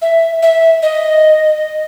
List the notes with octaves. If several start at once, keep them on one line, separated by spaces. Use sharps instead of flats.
E5
E5
D#5